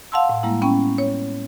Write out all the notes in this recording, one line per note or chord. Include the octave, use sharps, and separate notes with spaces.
F5 F#5 A5 C6 E6
A2
G3 G#3 A#3 E4
B3 C#4 G5 C#6
C#5